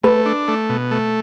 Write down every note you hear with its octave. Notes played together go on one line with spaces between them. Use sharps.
A3 B4
D4
A3
B2
A3